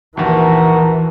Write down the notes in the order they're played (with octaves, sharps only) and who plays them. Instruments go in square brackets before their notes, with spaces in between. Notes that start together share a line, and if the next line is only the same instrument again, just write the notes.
[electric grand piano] A#1 D#2 [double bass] E3 [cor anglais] F#4 [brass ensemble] A#4 A5 A#5